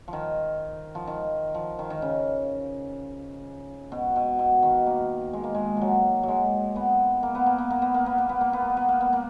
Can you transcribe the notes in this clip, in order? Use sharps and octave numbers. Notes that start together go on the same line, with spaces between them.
F3
D#3
F3
D#3
F3
D#3
D#3
C#3
B2
B2
B2
D#3
A#3
G#3
A#3
G#3
F3 F#3
F#3 G#3
B3
A#3
B3
A#3
B3
A#3
B3
A#3
B3
A#3
B3
A#3
B3
A#3
B3
A#3
B3
A#3